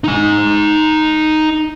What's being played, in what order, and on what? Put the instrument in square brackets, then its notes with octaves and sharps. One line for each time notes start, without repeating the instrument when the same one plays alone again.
[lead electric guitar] D#4 G#5